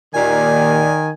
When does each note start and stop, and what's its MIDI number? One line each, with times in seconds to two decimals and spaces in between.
0.14 0.87 39
0.14 0.87 46
0.14 1.10 51
0.14 0.92 74
0.14 1.09 80